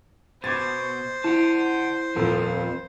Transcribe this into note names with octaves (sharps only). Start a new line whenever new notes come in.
B2 C5 D6 G#6 A6
E4 F#5 A5
D#1 F2 F3 C4 A4